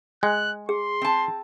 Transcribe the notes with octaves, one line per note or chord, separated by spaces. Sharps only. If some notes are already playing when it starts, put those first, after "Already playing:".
G#3 G#5 F#6
G#4 C6
C4 A5